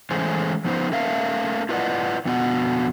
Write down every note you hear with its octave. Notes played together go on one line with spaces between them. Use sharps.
E3 G#3 A3 C#4 G#4 C5
F3 B3 D#4 F#4 B4 C5
A3 C#4 A#4 E5 F5
E4 F4 B4 D5 D#5 F#5
F2 D3 B3 F#4